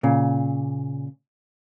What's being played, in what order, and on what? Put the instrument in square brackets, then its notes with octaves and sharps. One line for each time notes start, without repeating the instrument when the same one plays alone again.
[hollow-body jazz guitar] A#2 C#3